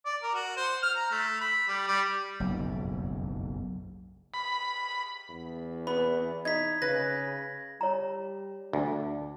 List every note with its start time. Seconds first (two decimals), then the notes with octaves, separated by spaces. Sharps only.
0.06 D5
0.23 A#4
0.34 F#4
0.57 C5
0.83 F6
0.97 A#5
1.11 A3
1.41 B5
1.68 G3
1.88 G3
2.40 F#1 B1 F2 G#2
4.34 B5
5.29 E2
5.87 B3 B5
6.45 D#4 G#6 B6
6.82 C#3 B4 A#6
7.81 G3 C#5 A#5
8.73 D2 D4